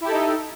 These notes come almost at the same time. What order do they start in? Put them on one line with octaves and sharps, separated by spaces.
E4 G4 A4 D#4